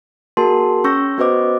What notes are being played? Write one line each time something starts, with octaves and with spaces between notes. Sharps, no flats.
A#3 F#4 G#4 A#4 A5 C6
C#4 C#6 E6 G6 A#6
B3 F#4 B4 C5 D#5 D6